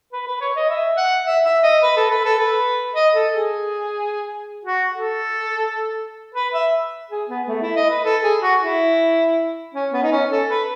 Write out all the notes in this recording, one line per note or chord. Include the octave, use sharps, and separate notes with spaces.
B4
B4
C#5
D#5
E5
F#5
E5
E5
D#5
B4
A4
B4
A4
B4
D#5
A4
G#4
F#4
A4
B4
E5
G#4
B3
A3
E4
D#5
B4
A4
G#4
F#4
E4
C#4
B3
D#4
C#4
A4
B4